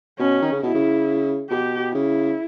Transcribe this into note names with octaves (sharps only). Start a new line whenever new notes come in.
B2 C#4
D#3
C#3
B2 E4
C#3
B2 G4
C#3 E4